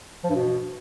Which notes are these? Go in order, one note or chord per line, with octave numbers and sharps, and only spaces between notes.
F3
G2
B2